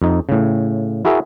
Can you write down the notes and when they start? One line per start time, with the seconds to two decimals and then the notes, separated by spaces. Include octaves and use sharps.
0.02 F2 D#4
0.29 A2 C#3
1.05 E4 F#4 G#4 A#4 E5